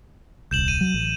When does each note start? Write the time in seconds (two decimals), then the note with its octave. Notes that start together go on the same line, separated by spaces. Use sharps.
0.51 D#1 C2 G6 E7 F#7
0.68 D#7
0.81 F#3
0.94 A1